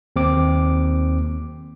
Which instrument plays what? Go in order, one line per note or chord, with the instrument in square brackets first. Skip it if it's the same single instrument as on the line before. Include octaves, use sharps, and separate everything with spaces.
[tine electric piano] D#2 C4 D6